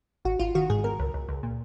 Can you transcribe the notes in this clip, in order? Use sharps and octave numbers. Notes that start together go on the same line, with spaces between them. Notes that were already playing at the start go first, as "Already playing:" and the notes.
G#1 F#4
G#1 F4
D#3 F#4
G#2 G#4
B2 A#4
C#2
C#2
C#2
A#2